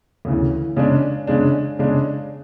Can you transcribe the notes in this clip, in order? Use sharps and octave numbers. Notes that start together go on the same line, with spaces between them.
D2 C#3 E3
C#3 G#3 D4
C#3 G#3 D4
C#3 G#3 D4